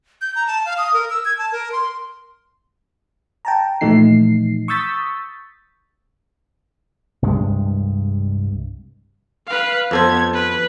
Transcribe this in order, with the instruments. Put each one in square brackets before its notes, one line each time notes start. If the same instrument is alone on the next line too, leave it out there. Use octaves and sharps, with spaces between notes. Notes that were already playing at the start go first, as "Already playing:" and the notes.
[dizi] G6
A#5
A5
F5
D#6
A#4
E6
G#6
A5
A#4
C6
[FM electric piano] G5 A5 A#5
A#2 E3 F3 A3 D#4 C7
C#6 D#6 E6 G6 A6 B6
[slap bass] C2 G2 G#3
[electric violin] B4 F5
[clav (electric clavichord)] F2 A4 C5 [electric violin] B3 G#6
[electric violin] B4